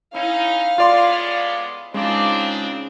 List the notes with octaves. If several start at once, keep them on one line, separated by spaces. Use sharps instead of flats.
C#4 D#4 E4 F5
A2 G#3 B3 F4 D5 C6
C#3 G#3 C4 D4 D#4 F4 D6